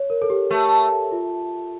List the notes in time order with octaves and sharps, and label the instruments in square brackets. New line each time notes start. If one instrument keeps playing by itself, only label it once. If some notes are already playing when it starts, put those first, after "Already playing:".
Already playing: [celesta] C#5
A#4
A4
G4
[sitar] A3 [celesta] G4
[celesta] F4